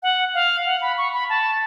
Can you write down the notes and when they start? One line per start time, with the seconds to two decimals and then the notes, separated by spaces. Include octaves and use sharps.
0.03 F#5
0.34 F5
0.66 F#5
0.82 B5
0.98 C#6
1.13 B5
1.29 A5